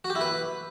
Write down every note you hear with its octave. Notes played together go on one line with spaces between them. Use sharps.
F#4
G4
E4
B4